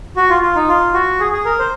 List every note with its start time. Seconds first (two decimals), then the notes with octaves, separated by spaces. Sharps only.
0.16 F#4
0.30 F4
0.42 F4
0.55 D#4
0.68 F4
0.94 F#4
1.20 G#4
1.33 G#4
1.45 A#4
1.59 C5